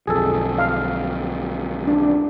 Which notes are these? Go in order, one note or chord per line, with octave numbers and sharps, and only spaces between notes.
B1 F2 G#4 A4
F5
D4